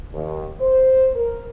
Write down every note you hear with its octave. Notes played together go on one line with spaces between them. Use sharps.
D#2
C5
A#4